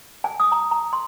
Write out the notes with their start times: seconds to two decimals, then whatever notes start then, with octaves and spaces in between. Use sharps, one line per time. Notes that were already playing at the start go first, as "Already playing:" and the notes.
0.24 G#5
0.40 D#6
0.52 A#5
0.71 A#5
0.93 C6